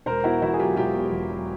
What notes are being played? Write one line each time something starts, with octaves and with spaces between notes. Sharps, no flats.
E1 A#4 C5
B2 E4 F#4
E2 E4 F#4
G#4
F#3 F4 G4
E1 F4 G4
B2
E2
F#3